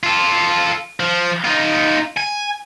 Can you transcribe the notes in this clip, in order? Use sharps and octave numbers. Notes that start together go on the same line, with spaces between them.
F4 A4
F3
D#4 F4
G#5